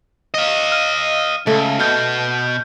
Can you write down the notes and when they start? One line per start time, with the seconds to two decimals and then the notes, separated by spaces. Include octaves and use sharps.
0.34 D#5 F5
0.72 F6 D#7
1.47 C#2 A3
1.80 B2 F6 G6